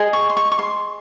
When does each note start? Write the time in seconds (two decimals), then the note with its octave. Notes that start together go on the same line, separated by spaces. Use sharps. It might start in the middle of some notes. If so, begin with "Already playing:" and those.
Already playing: G#4 D#5
0.13 C#6
0.30 C6
0.37 C#6
0.52 C#6
0.59 C6